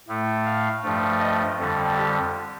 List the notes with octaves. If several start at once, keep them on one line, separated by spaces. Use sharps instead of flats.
A2 A3
F5
G2 F3 A3
D#5
F2 D3 G3
G4